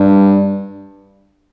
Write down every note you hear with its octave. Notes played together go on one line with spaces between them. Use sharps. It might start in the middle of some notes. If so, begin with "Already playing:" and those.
Already playing: G2